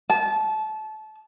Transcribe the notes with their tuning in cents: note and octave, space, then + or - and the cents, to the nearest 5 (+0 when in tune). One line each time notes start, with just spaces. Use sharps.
A5 -25